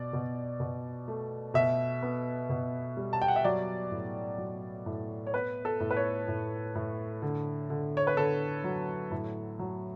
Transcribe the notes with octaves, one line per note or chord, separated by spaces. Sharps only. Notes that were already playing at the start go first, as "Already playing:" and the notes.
Already playing: B2 D5
B2
B2
A3
B2 E5
B3
B2
G3
A5
G5
F#5
E5
F#3 D5
A2
F#3
A2
C#5
B3 B4
A4
A2
B4
C#5
A2
A2
D3
D3
C#5
B4
D3 A4
F#3
A2
F#3